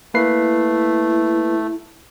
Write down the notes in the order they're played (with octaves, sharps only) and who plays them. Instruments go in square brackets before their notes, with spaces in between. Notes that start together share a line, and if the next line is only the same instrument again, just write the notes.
[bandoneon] A3 [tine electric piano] A#3 B4 C7 [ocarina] E4